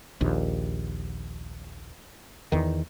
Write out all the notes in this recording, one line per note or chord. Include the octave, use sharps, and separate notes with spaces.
A#1 D#2
E2 D#3